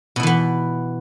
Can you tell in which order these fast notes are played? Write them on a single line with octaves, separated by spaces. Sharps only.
B2 E4 E3 B3